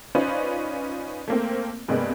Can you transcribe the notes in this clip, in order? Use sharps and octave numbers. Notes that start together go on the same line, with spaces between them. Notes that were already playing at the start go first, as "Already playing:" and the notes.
C#4 D#4 F4 B4 C5 D5
A3 A#3 C4
G2 C3 G#3 A#3 B3